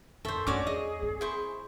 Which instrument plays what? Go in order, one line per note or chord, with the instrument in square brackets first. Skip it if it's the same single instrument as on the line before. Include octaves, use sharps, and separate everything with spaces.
[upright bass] F2 [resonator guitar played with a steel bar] A4 [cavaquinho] C5 E5 [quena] C#6
[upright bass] E2 A3 [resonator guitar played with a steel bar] C#4 F#4 [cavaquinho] C#5 D5 D6
[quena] G#4 [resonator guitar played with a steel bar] D#5
[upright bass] C4
[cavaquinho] E4 C5 C#6